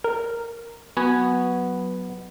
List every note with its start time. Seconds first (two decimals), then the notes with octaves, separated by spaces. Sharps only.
0.04 A#4
0.97 F#3 B3 F#4 B4 G#5